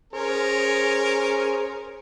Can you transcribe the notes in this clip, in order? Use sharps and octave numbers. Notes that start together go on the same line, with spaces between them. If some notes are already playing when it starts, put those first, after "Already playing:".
C#4 G#4 A#4 C5